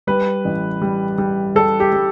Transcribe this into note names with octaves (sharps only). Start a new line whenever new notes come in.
G3 B4
A1
G3
G3
G3 A4
G4
G3